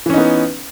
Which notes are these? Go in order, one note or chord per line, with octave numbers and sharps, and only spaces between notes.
E3 B3 C#4 D#4